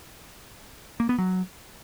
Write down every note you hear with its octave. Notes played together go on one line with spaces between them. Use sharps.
A#3
B3
F#3